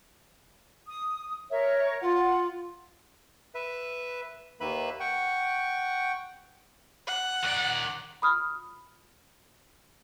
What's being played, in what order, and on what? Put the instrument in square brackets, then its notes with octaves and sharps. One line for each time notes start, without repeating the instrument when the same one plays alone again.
[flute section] D#6
[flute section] A#4 C#5 [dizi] E5
[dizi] F4 [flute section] F#5
[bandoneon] B4 E5
D#2 D#3 A#3 B4 E5 B5
F#5 G5 C#6
[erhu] F#5
[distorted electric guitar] D#3 D5
[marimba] B5 D#6 F6